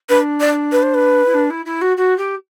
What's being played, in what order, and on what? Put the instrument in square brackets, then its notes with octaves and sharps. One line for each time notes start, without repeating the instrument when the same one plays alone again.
[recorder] D4 [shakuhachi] B4
[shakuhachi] D5
B4
C5
B4
[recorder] E4
D4
E4
E4
F#4
F#4
G4